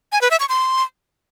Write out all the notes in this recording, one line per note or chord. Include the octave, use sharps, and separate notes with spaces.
G#5
B4
E5
C#6
C6